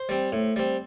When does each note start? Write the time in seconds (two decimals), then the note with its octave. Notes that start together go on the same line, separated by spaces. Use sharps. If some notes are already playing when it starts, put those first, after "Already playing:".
Already playing: C5
0.09 G3 C4
0.32 A2
0.56 G3 C4